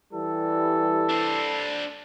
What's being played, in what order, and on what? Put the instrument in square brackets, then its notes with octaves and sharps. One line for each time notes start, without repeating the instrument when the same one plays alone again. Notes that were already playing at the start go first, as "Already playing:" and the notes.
[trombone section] E3 G3 [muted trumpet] A4
[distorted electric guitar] D4 C5